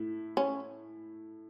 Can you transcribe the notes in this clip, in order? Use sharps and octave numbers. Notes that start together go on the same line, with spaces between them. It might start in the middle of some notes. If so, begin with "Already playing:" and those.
Already playing: A2 A3 E4
C#4